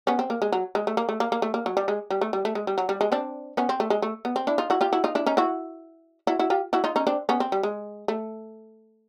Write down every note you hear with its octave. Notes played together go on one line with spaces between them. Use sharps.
B3 C#4
C4
A#3
G#3
F#3
G#3
A3
A#3
A3
A#3
A#3
A3
A#3
F#3
G3
G#3
G3
A3
G3
A3
G#3
G3
F#3
G3
G#3
C4 D4
B3 C#4
C4
A3
G#3
A3
B3
C4
D4 E4
D#4 F4
E4 F#4
F4 G4
E4 F#4
D#4 F4
D4 E4
C#4 D#4
E4 F#4
E4 F#4
E4 F#4
F4 G4
E4 F#4
D#4 F4
C#4 D#4
C4 D4
B3 C#4
C4
G3
G#3
A3